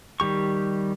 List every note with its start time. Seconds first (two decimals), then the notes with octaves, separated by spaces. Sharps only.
0.20 D#3 G3 G4 C#6